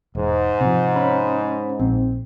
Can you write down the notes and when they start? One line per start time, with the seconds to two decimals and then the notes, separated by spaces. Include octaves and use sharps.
0.15 E1 G#2
0.61 C3 F3
0.96 C#4 B5
1.79 A#1 C4